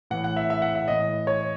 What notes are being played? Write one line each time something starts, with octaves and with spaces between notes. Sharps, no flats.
A2 E3 F#5
F#5
E5
E5
F#5
E5
A2 E3 D#5
C#5